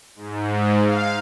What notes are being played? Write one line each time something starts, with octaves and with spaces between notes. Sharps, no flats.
G#2
F5